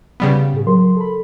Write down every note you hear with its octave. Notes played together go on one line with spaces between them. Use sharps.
C#3 G3 B3
A2 G#4
F#3 A#4 C6
A4 B5